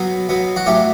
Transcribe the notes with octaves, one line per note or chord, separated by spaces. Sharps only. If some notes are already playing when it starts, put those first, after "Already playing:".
Already playing: B2 F#3 B3 F#4
B2 F#3 B3
F#4
A2 F#3 A3 G4